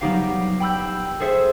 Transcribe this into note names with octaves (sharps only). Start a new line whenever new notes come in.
F#3 G3 B3 D#4 G4 F5
G5 B5 E6 G6
G#4 A4 C5 E5